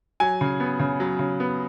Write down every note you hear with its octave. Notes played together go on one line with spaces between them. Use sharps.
F#3 G#5
C#3
B3
C#3
F#3
C#3
B3